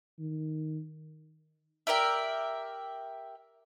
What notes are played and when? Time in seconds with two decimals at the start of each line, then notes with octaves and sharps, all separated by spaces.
0.19 D#3
1.87 G4 A#4 D5 E5